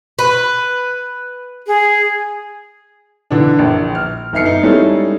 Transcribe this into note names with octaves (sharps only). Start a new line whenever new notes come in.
B4
G#4
D3 E3 D4
A#1
F6
G1 D#4 E5 F6 C7 C#7
D#4
G3 G#3 C#4 D#4 E4 A4